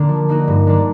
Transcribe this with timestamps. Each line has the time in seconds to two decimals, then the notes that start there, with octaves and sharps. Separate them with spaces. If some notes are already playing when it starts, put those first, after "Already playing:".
Already playing: D3 A#3 D4
0.09 F3
0.29 A#3 D#4 F#4
0.48 G2
0.67 D3 F#3 A#3 D4